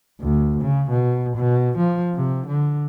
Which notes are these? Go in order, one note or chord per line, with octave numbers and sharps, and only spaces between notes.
D2
C#3
B2
B2
F3
C3
D3